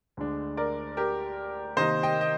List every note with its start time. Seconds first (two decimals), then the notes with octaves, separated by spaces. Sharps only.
0.17 D2 D3 G#3 D4
0.57 A#4 D5
0.97 G4 A#4
1.77 C3 D#3 A#3 D#4 C5 D#5
2.03 D#5 G5
2.21 D#5